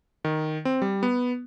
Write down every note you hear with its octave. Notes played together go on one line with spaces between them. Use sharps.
D#3
C4
G3
B3